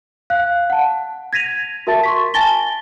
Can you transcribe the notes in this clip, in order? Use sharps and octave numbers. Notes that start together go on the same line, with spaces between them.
F5 F#6
F#5 A5
G#6 A#6 B6 D#7 F7
F#4 A#4 E5 A5 A6
C6 C#6 B6
G#5 A5 A6 A#6 G7